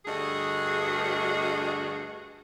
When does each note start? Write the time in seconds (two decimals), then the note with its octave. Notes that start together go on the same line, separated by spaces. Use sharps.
0.06 D2 G2 F#4 G#4 D#5